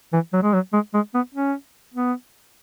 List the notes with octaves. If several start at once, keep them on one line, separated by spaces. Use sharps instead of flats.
E3
F#3
G#3
F#3
G#3
G#3
B3
C#4
B3